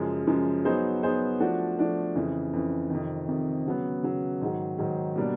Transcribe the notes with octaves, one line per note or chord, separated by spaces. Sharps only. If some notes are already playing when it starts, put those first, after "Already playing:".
Already playing: F#2 C#3 F3 G#3
F#2 C#3 F3 G#3
F#3 B3 D#4 G#4 C5
F#3 B3 D#4 G#4 C5
F3 A3 D4 F#4
F3 A3 D4 F#4
F2 C#3 E3
F2 C#3 E3
F2 C3 D#3
F2 C3 D#3
C#3 F#3 B3
C#3 F#3 B3
G#2 D#3 F#3
G#2 D#3 F#3
B2 G3 A#3 D4